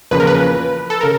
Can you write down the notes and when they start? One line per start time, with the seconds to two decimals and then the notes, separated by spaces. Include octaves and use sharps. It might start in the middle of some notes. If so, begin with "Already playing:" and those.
0.11 E2 C#3 F3 A#3 C#4 B4
0.20 A#4
0.27 B4
0.90 A4
1.01 C#3 A#4